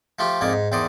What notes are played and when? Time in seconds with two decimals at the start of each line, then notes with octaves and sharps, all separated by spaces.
0.19 F3 A3 F4 G4
0.41 F2 G#2 A#3 D#4 D5
0.53 G#2
0.72 E2 D#3 C5 D5 D#5